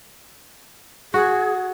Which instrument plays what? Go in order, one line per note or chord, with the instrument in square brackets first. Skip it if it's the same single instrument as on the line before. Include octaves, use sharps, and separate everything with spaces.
[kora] F#4 [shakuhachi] G#4